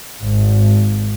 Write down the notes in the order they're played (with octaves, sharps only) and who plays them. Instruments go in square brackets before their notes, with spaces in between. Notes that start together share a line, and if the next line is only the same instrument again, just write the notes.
[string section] G#1